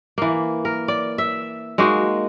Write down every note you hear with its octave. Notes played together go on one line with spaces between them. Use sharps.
E3 A#3
A#4
D5
E5
G#3 A#3 D#4 F#4